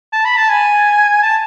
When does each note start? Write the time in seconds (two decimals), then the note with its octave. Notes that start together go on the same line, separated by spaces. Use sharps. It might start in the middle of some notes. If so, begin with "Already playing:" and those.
0.12 A5
0.25 B5
0.37 A5
0.49 G#5
1.22 A5